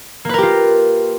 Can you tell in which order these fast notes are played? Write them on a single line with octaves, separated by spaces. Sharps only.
A#3 B4 A#4 G4 F4